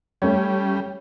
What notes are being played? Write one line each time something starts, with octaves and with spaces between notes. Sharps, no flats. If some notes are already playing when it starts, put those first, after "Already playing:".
G3 A3 C#4 C#5